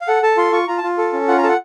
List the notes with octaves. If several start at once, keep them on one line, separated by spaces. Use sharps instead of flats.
F5
A4 F#5
A4 A5
F4 C6
F4 C#6
F4 A#5
A5
F4
A4
C#4
F4 F#5
A#5
A4 F#5 A5